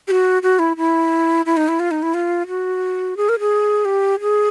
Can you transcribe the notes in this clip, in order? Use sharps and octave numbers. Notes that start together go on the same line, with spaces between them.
G4
F#4
F#4
E4
E4
E4
D#4
E4
F4
D#4
E4
F4
F#4
G#4
A#4
G#4
G4
G#4